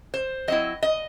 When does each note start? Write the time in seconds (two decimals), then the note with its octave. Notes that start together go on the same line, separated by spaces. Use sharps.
0.14 C5
0.48 F#3 C4 E4 D#5
0.83 D#5